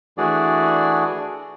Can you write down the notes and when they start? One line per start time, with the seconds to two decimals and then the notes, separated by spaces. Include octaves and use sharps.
0.18 E3 A3 D4 F#4 G#4 D5